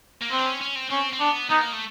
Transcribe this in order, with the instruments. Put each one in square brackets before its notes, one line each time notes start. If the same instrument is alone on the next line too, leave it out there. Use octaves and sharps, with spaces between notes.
[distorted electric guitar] A#3
[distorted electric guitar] B3 [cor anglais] C4
[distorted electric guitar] D4
C#4
C#4
C4
[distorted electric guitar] C4 [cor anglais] C#4
[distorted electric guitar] C4
[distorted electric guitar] B3 [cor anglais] D4
[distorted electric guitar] B3 [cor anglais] D#4
[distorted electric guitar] A#3
A3